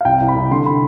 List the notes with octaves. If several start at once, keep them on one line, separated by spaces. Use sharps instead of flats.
F5
C2 G5
C2
B5
C2
D3 C6
B5